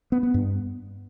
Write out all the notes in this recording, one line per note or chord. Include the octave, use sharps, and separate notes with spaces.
B3
B3
G2